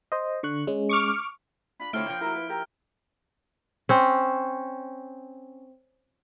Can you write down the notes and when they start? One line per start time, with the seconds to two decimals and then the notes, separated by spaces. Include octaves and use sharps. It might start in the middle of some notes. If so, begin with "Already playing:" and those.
0.12 C5 D#5
0.43 D3 C#6 F#6
0.67 G#3 C#4
0.89 C#6 D6 F6
1.79 D4 F4 B5
1.93 D3 A3 C4 E4 F4 C#5 F6 D7
2.07 F3 A#3 G5
2.21 E4 F#4 A#4
2.35 B4
2.49 E4 G4 A#4
3.89 C4 C#4